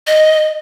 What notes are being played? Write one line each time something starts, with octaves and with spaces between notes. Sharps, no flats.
D#5